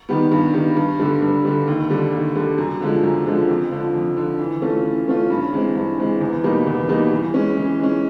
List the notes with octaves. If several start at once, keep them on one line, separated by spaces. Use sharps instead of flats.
D#3 G3 B3
G2
D#3 G3 B3
G2
D3 G3
G2
D3 G3
D#2
D3 G3
D#2
D3 G3
F#2
D3 F3 G#3
F#2
D3 F3 G#3
F2
D3 F3
F2
D3 F3
E3
A3 C#4 F4
E3
A3 C#4 F4
G2
E3 G#3 C4
G2
E3 G#3 C4
E2
B2 G3 A#3 D#4
E2
B2 G3 A#3 D#4
E3
G#3 C#4
E3
G#3 C#4